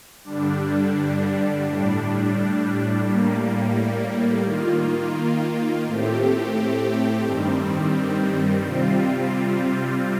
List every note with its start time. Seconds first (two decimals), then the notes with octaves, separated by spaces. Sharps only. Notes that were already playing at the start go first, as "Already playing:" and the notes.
0.24 G2 D3 G3 D4
1.64 A2 G3 D4
3.04 A2 G3 A#3
4.44 D#3 A#3 F4
5.85 A2 A3 C4 G4
7.25 G2 D#3 G3 C4
8.65 C3 G3 C4 F4